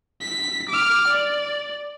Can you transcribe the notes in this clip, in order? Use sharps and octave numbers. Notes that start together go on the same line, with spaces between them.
B6
D6 F6
D5